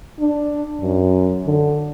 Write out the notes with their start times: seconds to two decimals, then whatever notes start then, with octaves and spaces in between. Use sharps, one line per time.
0.20 D4
0.81 F#2
1.45 D3